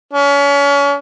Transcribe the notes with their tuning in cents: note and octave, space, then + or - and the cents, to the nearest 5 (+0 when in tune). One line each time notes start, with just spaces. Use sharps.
C#4 +35